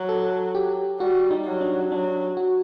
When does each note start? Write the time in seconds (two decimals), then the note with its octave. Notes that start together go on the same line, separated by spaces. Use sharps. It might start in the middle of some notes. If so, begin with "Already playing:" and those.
Already playing: F#3
0.09 A4
0.55 G4
1.00 G3 F#4
1.31 D#4
1.45 F#3
1.61 D4
1.91 F#3 D4
2.37 F#4